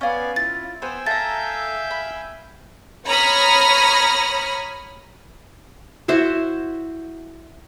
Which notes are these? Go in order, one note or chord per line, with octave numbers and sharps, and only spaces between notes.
B3 C#4 D5 F5 G#5
E4 F4 A6
B3 C5 G5 G#5 E6
A4 E5 F5 A#5 G6 A6
B5
C#5 A#5 B5 D#6 F6
E4 F#4 C5 E5